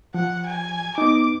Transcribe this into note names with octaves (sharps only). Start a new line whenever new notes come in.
F3 F#5
G#5
B3 D#4 D6